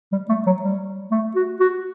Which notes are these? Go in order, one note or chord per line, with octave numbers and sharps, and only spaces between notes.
G3
A3
F#3
G3
A3
F#4
F#4